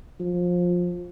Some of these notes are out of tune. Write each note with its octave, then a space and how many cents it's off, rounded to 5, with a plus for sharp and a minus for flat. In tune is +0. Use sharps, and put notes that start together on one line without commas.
F3 +20